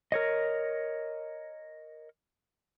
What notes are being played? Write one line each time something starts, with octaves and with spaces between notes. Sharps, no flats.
A#4 C#5 D#5